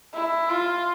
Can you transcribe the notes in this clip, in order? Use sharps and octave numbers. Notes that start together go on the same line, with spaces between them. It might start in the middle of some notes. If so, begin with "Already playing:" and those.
E4
F4